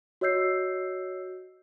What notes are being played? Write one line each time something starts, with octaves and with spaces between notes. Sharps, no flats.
F#4 C#5 D#5 E6 G6 C7